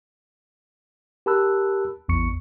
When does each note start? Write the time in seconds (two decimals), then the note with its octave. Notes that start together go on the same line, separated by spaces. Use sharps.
1.26 G4 A#4 A5 B5 E6 F#6
2.08 A1 E2 C#6 C#7